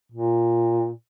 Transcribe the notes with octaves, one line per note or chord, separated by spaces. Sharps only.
A#2